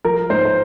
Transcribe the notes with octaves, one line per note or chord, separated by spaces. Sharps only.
F3 A#4
G#2 C5
C5